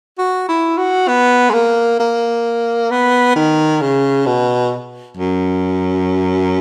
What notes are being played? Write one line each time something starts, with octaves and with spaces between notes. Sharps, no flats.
F#4
E4
F#4
B3
G#3
A#3
A#3
B3
D#3
C#3
B2
F#2